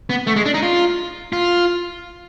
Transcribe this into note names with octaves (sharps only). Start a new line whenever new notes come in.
B3
A3
G#3
D4
D#4
F4
F4